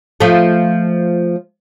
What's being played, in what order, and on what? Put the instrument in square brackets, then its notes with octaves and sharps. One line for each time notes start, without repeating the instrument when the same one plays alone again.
[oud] F3 A3